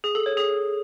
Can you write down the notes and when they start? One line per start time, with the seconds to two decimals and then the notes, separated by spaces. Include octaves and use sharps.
0.04 G#4
0.15 A4
0.26 C#5
0.37 G#4